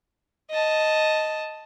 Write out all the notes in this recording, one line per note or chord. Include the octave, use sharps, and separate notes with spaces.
D#5 A5